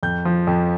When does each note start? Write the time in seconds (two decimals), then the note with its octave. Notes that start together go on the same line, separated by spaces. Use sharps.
0.03 F2 G6
0.25 F3
0.47 F2